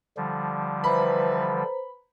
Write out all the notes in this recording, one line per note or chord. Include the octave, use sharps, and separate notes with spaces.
D3 F3 G3
E3 B4 C5 A#5 B5